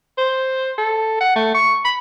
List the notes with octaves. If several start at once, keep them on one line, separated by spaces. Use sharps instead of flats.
C5
A4
F#5
A3
C#6
B5